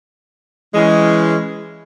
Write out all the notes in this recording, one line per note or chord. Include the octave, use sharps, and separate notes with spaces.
E3 G#3 C#4